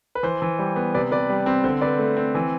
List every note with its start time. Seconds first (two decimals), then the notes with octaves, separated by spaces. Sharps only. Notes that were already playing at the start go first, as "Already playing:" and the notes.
0.15 B4
0.23 E3 C5
0.42 E3
0.59 G3
0.76 B3
0.94 C3 B4 D5
1.12 C3 B4 D5
1.30 G3
1.46 C4
1.64 D3 C5
1.81 D3 B4 D5
1.99 A3
2.17 C4
2.35 E3